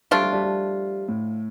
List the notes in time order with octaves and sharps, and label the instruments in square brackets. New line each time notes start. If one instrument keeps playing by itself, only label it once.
[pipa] F3 A3 D4 F4 [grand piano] G3
[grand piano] G3
G3
G3
A2